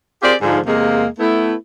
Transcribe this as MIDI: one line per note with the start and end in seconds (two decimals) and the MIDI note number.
0.23 0.35 60
0.23 0.35 65
0.23 0.35 67
0.23 0.35 68
0.23 0.35 70
0.23 0.35 74
0.42 0.58 44
0.42 0.58 50
0.42 0.58 53
0.66 1.07 40
0.66 1.07 48
0.66 1.07 56
0.66 1.07 58
1.19 1.54 57
1.19 1.54 59
1.19 1.54 64